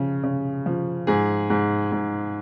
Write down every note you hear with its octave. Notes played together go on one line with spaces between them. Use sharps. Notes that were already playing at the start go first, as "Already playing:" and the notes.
Already playing: C#3 F3
C#3
F3
G#2 G#4
G#2
G#2